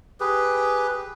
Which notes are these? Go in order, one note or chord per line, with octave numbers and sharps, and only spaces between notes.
G4 G#4 B4